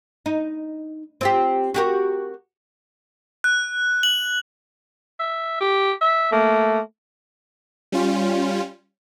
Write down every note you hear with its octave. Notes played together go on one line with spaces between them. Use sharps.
D#4
C4 F4 G4
F#4 G4 A#4
F#6
F#7
E5
G4
E5
A3 A#3
G3 C#4 F4